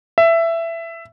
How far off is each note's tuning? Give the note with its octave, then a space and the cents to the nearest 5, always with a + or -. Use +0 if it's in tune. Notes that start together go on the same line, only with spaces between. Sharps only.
E5 +15